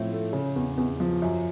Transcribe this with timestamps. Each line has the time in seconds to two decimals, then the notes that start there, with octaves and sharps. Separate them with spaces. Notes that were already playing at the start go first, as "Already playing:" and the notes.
Already playing: A2 F3 C4
0.11 A3
0.33 C#3
0.56 E2
0.77 E2
1.00 F3
1.22 F#2